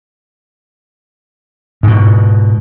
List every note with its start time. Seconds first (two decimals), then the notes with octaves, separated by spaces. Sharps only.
1.83 G#2 B2